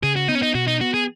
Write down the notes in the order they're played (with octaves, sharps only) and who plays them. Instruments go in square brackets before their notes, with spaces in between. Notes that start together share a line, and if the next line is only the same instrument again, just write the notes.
[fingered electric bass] C#3 [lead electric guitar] G#4
[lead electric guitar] F#4
[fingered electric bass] B3 [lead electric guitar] D#4
[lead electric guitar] C#4
D#4
[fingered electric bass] B2 [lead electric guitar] F#4
[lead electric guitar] D#4
[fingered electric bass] B3 [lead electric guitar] F#4
[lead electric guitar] G#4